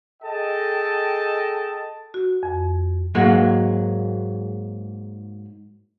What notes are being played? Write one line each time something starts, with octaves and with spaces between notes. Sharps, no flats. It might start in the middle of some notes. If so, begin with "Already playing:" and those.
G#4 A4 D#5 G5 A5
F#4
F2
G#2 F#3 G#3 A#3 F#4